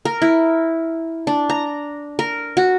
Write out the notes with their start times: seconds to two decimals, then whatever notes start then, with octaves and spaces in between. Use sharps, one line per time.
0.05 A#4
0.22 E4
1.27 D4
1.50 A#5
2.19 A#4
2.57 F#4